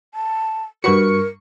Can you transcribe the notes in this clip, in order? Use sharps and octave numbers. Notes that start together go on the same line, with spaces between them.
A5
G2 F#4 A#4 B4 F#5 C#6 C#7